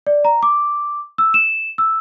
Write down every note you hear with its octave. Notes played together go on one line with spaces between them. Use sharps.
D5
A#5
D6
E6
E7
E6